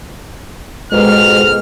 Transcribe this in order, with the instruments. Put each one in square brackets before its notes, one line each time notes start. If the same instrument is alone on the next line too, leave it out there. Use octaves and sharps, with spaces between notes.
[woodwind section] F2 G#2 B2 [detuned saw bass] G#3 [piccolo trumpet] F6